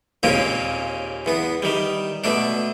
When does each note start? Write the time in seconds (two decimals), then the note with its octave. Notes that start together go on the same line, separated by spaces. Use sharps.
0.23 D#2 A#2 C#3 A#3 C4 C#4
1.26 E2 B3
1.62 D#3 G3
2.24 B2 A3 D4